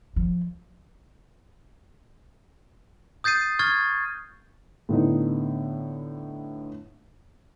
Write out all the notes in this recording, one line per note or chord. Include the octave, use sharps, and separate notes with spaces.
F3
D#6 G6 A6 C7 D#7
C#6 F6 G#6 A6
A2 D3 B3 D#4